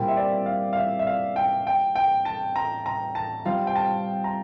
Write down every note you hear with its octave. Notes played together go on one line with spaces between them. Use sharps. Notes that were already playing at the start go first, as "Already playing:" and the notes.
Already playing: A#2 G3 C4 E4
E5
D5
F5
F5
E5
E5
F5
G5
G5
G5
A5
A#5
A#5
A5
G3 C4 F4 F5
G5
A5
A#5